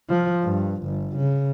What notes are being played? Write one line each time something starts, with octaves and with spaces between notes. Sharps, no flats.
F3
G2
G1
C#3